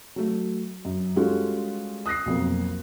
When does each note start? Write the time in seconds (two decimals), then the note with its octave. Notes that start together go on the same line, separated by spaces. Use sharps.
0.16 F#3 A3
0.85 F#2
1.16 G3 G#3 C#4 F4 F#4 A4
2.06 D#6 F#6 A#6 C7
2.26 B1 F2 A#3